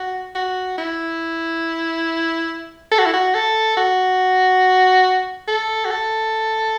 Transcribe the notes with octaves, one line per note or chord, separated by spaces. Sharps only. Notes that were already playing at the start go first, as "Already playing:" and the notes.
Already playing: F#4
F#4
E4
A4
F#4
E4
F#4
A4
F#4
A4
F#4
A4